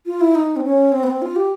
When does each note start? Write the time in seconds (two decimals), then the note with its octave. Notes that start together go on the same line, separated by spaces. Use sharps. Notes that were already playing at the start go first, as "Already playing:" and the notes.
0.06 F4
0.21 E4
0.35 D#4
0.56 C4
0.64 C#4
0.92 C4
1.03 B3
1.06 C4
1.22 F4
1.36 G4